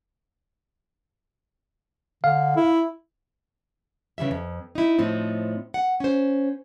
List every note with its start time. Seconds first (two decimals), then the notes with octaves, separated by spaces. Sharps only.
2.24 D3 F5
2.56 E4
4.18 C#3 E3 G3 E5
4.31 F2
4.75 D#4 E4
4.98 A2 F3 C4 D#4
5.74 F#5
6.00 C#4 C5